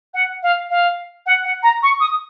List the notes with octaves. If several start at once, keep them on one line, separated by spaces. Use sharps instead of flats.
F#5
F5
F5
F#5
F#5
A#5
C#6
D#6